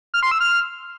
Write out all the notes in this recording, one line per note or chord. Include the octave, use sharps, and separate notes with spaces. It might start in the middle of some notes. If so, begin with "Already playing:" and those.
F6
C6
E6
F6